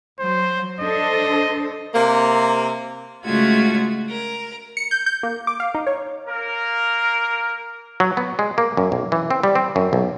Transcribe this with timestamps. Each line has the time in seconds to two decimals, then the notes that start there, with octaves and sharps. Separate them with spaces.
0.20 F#3 C5
0.81 D4 A4 C5 D#5
1.94 C3 A#3
3.24 C#3 G#3 A3 F4 F#4 G#6
4.09 A#4
4.77 C#7
4.91 G6
5.06 G6
5.23 A#3
5.47 D6
5.60 F5
5.75 D#4
5.87 C#5
6.28 A#3 A#4
8.00 F#3
8.17 B3
8.39 G#3
8.58 A#3
8.77 F#2
8.92 B1
9.12 E3
9.30 C4
9.43 G3
9.55 C4
9.76 F#2
9.93 B1